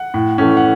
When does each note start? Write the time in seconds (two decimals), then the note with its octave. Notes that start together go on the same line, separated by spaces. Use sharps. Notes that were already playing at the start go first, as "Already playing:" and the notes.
Already playing: F#5
0.14 A2
0.38 E3 A3 C#4
0.57 F#5